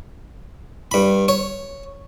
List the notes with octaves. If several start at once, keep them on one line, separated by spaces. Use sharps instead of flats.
G2 B5
C#5